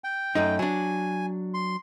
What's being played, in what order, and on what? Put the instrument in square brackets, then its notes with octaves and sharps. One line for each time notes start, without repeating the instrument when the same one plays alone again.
[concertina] G5
[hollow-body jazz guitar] F#2 A3 D#4
[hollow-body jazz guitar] F#3 D4 [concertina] G#5
[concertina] C6